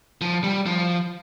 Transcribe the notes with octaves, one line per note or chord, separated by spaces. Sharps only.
F3
G3
F3